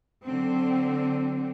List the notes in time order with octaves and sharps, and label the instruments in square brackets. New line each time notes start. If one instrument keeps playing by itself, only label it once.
[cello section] D3 F#3 C4